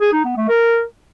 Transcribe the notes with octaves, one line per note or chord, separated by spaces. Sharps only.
G#4
D#4
B3
A3
A#4